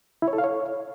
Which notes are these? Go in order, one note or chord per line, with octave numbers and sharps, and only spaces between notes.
E4
C#5
A4
F5
C#5